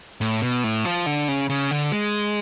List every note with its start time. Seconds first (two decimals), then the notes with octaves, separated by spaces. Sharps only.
0.21 A2
0.42 B2
0.64 A2
0.85 F3
1.06 D3
1.28 C#3
1.50 C#3
1.71 D3
1.92 G#3